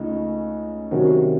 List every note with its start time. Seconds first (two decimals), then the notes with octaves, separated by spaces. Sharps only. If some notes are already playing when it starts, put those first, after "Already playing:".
Already playing: C#2 C#3 A3 D#4
0.91 C3 D#3 F#3 C#4 F#4